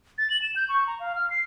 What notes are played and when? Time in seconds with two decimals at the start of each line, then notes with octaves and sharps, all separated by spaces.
0.18 A6
0.30 F#7
0.42 E7
0.56 G6
0.69 C#6
0.87 A#5
1.00 F5
1.15 F6
1.30 C7